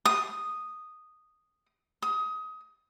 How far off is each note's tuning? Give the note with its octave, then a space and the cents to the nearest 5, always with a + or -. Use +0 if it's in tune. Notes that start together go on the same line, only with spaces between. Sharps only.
D#6 -5
D#6 +25